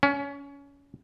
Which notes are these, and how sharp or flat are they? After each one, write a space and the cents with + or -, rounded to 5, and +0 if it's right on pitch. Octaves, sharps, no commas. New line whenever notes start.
C#4 +25